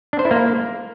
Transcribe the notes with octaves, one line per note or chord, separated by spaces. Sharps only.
D4
C5
E4
A#3